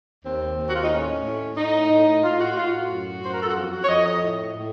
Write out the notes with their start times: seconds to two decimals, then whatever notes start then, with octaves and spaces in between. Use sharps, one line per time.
0.24 D#2 C4
0.57 D#2
0.68 F#4
0.76 F4
0.83 D#4
0.90 A2 C#4
1.24 A2
1.57 A2 D#4
1.90 A2
2.23 A2 F4
2.40 F#4
2.56 A2 F4
2.73 F#4
2.89 F#2
3.22 F#2 C5
3.33 A#4
3.40 A4
3.48 F#4
3.55 F2 F4
3.72 F#4
3.84 C#5
3.88 F2 D#5
4.05 D#5
4.22 A2
4.55 A2